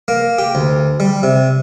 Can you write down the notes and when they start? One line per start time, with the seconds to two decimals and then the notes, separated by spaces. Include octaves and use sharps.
0.08 A#3
0.38 G4
0.55 D2
1.00 G3
1.23 C3